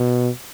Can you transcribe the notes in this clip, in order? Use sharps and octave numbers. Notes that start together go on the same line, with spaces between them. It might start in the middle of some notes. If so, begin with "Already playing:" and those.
Already playing: B2